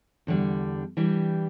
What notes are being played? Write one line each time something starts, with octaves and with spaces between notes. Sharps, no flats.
E2 D3 G3 D4
E3 G3 D4 G4